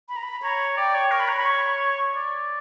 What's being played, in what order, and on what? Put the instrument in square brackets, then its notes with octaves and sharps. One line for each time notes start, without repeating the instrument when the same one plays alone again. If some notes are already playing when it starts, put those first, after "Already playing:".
[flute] B5
A#5
B5
[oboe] C#5 [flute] A#5
[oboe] D5 [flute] G5
[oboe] C#5
[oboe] A#4 [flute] C#6
[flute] B5
[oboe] C#5 [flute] A#5
[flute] B5
C#6
C#6
[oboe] D5